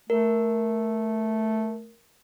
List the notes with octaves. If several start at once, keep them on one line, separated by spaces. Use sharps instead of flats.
A3 A#4